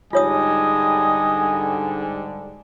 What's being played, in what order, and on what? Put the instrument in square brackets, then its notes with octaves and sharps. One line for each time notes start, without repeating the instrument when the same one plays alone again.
[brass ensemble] G#2 D3 G3 [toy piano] F4 C#5 D#6 [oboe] D#5 [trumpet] G#5